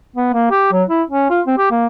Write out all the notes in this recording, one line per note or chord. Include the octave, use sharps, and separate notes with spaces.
B3
A#3
G4
F#3
E4
C#4
F4
C4
G4
A#3